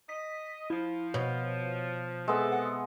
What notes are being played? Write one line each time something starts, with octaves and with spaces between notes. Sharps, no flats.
D#5 B6
F3 E4
B2 C#5
C3 G#3 B3 A4 E5
F#5